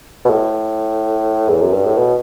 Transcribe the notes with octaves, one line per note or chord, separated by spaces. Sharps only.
B2
A2
E2
F#2
G2
A2
B2